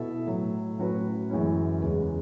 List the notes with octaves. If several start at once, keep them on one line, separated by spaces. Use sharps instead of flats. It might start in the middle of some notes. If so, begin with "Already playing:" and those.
Already playing: B2 E4 A4 E5
A2 F#3 A3
A2 F#3 C#4 F#4 B4
F#2 E3 G#3 C#4 E4
E2 C#3 G#3